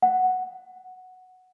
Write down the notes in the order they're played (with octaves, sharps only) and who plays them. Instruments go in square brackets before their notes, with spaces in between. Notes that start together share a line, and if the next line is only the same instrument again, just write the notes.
[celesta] F#5